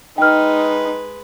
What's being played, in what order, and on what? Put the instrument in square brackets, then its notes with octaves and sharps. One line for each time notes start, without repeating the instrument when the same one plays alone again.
[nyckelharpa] G#3 B4 [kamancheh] D#4 [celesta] G5 F6